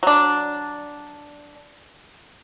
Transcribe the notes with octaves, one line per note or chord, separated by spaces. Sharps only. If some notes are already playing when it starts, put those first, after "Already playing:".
F#3 D4